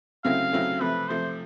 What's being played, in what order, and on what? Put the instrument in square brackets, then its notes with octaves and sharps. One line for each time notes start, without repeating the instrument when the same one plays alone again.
[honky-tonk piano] C#3 F#3 A3 C4 E4 [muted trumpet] F5
[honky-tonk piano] C#3 F#3 A3 C4 E4
[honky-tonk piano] C3 F3 A3 [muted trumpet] B4
[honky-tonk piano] C3 F3 A3 [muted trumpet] C5